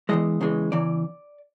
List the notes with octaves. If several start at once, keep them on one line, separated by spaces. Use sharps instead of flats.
E2 C#3 E3 G#3 D#5
E2 C#3 E3 G#3
E2 C#3 E3 D5